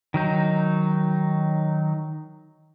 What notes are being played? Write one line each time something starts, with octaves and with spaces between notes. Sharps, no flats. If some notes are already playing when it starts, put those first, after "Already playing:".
D#3 F#3 D#4